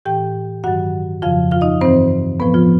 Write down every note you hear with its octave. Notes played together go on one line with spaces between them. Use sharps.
A2 E3 G4 G5
G2 D#3 F#3 F#4 F#5
F2 C#3 F3 F4 F5
F4 F5
D#4 D#5
G2 E3 C4 C5
A2 F3 B3 B4
F3 F4